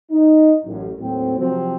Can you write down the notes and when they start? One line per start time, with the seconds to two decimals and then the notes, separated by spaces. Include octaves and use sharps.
0.11 D#4
0.64 A1 F#2
0.99 D#2 A2 F#3 C4
1.37 C3 F3 F#3 C4